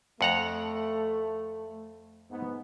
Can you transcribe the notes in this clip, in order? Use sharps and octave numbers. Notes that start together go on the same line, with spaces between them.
F2 A3 F#5 A#5
G#2 B3